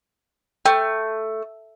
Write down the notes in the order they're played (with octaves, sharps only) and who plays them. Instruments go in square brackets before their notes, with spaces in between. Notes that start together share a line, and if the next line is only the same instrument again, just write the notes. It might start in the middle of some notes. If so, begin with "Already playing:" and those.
[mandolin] A3 [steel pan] G5